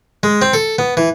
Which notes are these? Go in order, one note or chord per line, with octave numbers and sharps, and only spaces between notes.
G#3
C4
A4
B3
E3